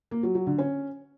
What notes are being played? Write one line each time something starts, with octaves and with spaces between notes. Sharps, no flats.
A#3
F#3
F#3
D3
C#4